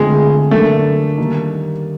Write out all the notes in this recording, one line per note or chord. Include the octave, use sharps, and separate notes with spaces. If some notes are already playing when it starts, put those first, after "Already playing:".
Already playing: D3 F3 G#3 A3 C4
D3 F#3 A3 A#3 D4
D#3 G3 A#3 D#4